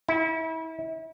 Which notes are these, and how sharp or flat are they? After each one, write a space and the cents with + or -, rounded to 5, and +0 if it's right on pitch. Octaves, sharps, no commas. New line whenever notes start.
E4 -35